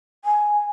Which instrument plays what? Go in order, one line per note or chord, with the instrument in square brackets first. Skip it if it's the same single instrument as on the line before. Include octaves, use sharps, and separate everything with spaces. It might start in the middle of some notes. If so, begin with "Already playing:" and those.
[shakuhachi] G#5